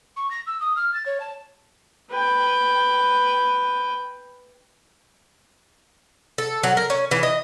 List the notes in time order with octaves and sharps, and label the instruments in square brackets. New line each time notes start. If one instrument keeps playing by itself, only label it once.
[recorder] C#6
A#6
E6
D#6
F6
A6
C#5
A5
[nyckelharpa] B4 G5
[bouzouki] A4
F#3
A#4
C#4
E3
D#5